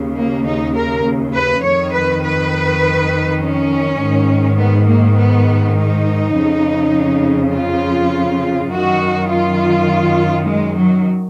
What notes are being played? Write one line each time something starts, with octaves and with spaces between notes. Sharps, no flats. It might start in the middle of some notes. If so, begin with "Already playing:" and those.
Already playing: D#2 C#3
A#3
D#4
A#4
B4
F2 D#3 C#5
B4
B4
C#4
G#2 D#3
B3
A#3
B3
D#4
F2 C#3
F4
F#2 D#3 F#4
F4
G#3
F#3